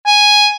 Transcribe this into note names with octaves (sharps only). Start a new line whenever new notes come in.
G#5